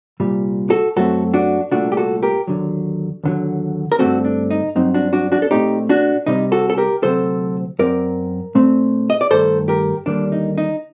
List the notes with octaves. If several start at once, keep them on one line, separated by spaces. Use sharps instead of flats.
C2 A#2 G3
F#4 A4
F#2 F#3 A3 C4 F#4 A4
D4 F#4
C2 A#2 A3 D4 F#4
G4
F#4 A4
G4 A#4
D#2 D3 F#3
D#2 D3 F#3
A#4
G2 D3 A3 C4 F#4 A4
D4
D#4
G2 F#3 C4 D#4
D4 F#4
D4 F#4
D4 F#4
A4
A#2 A3 C4 D#4 G4
D4 F#4
C2 C3 G3 D#4
F#4 A4
A4
G4 A#4
D2 C3 F#3 C4 A4 C5
F#2 F#3 C4 A#4 D5
A#2 A3 C4
D#5
D5
G2 D#3 A3 A4 C5
G4 A#4
D#2 D3 G3 A#3 D4
D#4
D#4